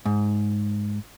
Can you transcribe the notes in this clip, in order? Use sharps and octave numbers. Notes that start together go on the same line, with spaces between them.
G#2